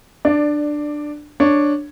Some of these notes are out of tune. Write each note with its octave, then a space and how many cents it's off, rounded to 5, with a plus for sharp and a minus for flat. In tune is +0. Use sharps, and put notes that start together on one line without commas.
D4 +15 D5 +0
D4 +0 C#5 +0